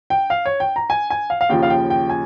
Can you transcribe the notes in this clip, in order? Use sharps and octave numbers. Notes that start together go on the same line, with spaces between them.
G5
F5
C#5
G5
A#5
G#5
G#5
F5
F5
D#2 C#3 F3 G5
F5
G5
G5
G#5